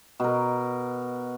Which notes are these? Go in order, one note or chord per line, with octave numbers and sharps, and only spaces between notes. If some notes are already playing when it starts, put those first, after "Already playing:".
B2 A#4